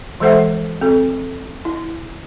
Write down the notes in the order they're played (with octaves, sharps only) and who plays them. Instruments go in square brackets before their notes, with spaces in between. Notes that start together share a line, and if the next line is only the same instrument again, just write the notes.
[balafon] E3 G#3 A4 C5 E5 F#5
C4 A4
E4